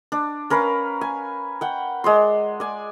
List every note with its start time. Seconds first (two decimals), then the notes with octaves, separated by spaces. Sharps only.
0.12 D4
0.50 C#4 A#4 B4 F5
1.01 G#5
1.61 F#5 G5
2.04 G#3 D5 C6
2.60 D5 G#5